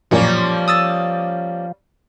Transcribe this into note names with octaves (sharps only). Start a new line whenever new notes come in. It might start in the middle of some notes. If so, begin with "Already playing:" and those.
A1 F#2 A#2 F3 G3 A#3 C#4
D#6 E6 A6